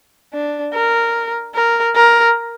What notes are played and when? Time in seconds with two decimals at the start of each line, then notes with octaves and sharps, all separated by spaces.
0.34 D4
0.74 A#4
1.55 A#4
1.95 A#4